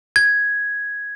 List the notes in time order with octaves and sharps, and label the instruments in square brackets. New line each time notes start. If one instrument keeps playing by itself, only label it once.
[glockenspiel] G#6